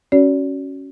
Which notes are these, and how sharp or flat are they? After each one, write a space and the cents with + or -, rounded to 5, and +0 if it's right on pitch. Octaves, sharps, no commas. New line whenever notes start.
C#4 +0 F#4 +15 D5 -40